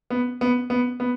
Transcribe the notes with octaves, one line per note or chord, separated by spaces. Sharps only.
B3
B3
B3
B3